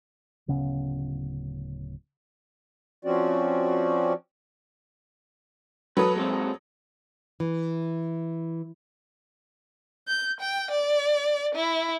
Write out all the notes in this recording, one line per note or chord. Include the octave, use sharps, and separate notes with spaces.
D1 C#3 B3 C#4
F3 C4 C#4 F#4 D5
F#3 A4 B4 D#6
A#2 G#3 C4
E3
G6
G5
D5
E4